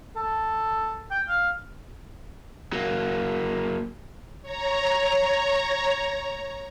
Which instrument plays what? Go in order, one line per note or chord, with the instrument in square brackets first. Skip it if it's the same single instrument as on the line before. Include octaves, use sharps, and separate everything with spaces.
[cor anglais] A4
G5
F5
[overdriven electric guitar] F#3 A#3
[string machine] C#5 A#5